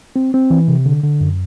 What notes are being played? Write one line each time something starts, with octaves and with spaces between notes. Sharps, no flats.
C4
C4
E3
C3
D3
D3
F#2